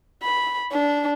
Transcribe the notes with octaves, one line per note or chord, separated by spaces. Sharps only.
B5
D4